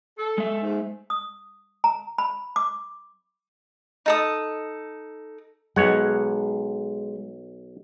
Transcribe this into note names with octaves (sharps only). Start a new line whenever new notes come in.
A4
G#3 E5
G#2
D#6
A#5
B5
D6
D#4 A4 D#6
B1 G#3 C#5 F#5